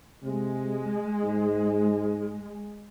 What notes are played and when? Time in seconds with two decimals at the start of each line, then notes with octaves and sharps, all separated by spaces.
0.23 C3 G#3
1.23 G#2